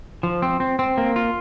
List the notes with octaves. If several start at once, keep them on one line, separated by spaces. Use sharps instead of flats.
F3
C4
C4
C4
A#3
F4